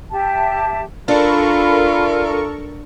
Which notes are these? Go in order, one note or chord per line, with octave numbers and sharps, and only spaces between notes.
G4 E5 A5
D4 F4 A4 A#4 B5 C#6